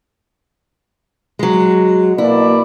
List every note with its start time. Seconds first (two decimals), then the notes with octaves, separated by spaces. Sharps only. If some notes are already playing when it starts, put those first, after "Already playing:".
1.39 F#3 G#3
2.18 B2 A#3 E4 D5